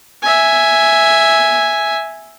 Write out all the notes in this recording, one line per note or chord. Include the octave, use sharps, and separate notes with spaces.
E5 G#5